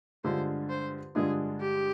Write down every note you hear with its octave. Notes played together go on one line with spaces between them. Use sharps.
G2 D3 G#3 D4 F4 C5
C5
G2 D3 G#3 D4 F4 G#4
G4